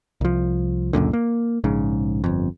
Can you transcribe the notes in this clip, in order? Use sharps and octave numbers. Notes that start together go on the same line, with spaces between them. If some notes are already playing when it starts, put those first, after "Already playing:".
C2 F3
C#2 F#2 A#2 D3
A#3
A#1 G#2 C#3
G1 F2